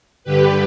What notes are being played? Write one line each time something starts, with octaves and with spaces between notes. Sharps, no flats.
G2 D3 G4 B4